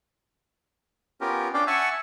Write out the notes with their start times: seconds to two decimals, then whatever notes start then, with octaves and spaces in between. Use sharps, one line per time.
1.21 B3 C#4 F4 G4 A#4
1.54 C#4 D4 D5 F5 G5 D6
1.67 E5 F#5 G#5 A5 C#6 E6